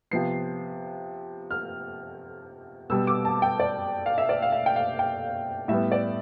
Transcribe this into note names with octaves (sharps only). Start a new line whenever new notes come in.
C3 F3 B3 C7
F6
B2 G3 B3 E6
D6
A5
G5
D5
F5
E5
D5
F5
E5
G5
F5
G5
A2 G3 B3 E5
D5